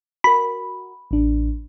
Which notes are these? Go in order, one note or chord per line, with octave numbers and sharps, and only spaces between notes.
F#4 A#4 B5
A1 D4